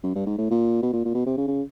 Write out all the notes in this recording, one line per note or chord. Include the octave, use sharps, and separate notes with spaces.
F#2
G2
G#2
A2
A#2
B2
A#2
A#2
B2
C3
C#3
C#3